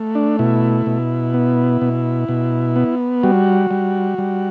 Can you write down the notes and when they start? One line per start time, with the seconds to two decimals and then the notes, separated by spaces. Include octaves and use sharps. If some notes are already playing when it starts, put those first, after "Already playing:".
Already playing: A3
0.15 D4
0.39 B2 E4
0.86 B2
1.34 B3
1.81 B2
2.29 B2
2.76 B3
3.23 G3 F#4
3.71 G3
4.18 G3